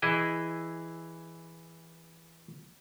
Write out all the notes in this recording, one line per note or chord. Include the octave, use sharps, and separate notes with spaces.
E3 E4 G#4 D#5